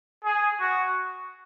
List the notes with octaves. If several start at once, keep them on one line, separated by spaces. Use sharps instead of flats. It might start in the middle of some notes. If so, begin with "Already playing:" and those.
G#4
F#4